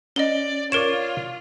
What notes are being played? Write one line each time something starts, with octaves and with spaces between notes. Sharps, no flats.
C#4 D5 D#5 G7
F4 A#4 C#5 D5 D7 E7